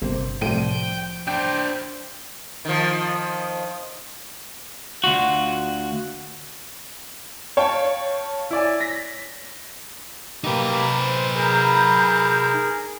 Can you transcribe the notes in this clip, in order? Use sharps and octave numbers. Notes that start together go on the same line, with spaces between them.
G1 C3 A#3 C4
C2 A2 F3 D5 G5 D#7
D4 C5 G5
D#3 F3
D2 F4 F#4
C#5 F5 G5 A5
E4 D5 G#5
A#6 B6
A#3 D#4 G4 B4
C5
G#4 A#4 A#5 B5 G6